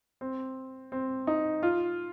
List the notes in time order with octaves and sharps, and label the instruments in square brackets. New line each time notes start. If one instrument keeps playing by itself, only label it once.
[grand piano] C4
C4
D#4
F4